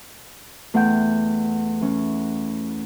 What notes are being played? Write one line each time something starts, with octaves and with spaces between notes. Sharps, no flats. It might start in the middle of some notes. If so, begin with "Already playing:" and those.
E2 A3 E4 F#5 G5 G6
E3 C#4